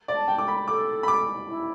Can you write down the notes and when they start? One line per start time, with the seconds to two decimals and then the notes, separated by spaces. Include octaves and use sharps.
0.08 D5
0.15 A5
0.28 G5
0.38 D6
0.48 B5
0.68 A4 D6
1.03 B5
1.08 D6
1.48 E4